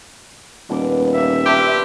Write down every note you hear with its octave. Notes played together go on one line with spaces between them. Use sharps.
D#1 B2 D6
A#3 G4 E5
D4 G4 B4 C5